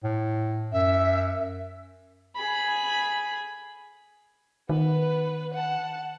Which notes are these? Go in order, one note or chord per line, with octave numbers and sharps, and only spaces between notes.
A2
F#2 E5
G#4 B5
D#3 B3 B4
F#5 A5